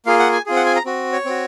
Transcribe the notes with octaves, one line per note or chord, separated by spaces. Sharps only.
A#3 F4 G#4 F5
F#5
G#5
C4 F4 G#4
F#5
G#5
A#5
C4 F#4
C#5
C4 F#4